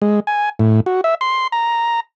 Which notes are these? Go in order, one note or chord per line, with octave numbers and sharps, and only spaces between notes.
G#3
G#5
A2
F#4
E5
C6
A#5